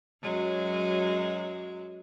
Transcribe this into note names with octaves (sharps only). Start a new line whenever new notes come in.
F#2 F#3 G#3